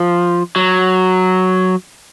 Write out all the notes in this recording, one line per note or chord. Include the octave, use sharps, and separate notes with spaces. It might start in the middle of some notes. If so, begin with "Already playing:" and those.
Already playing: F3
F#3